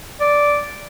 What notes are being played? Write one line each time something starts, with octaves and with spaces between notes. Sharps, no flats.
D5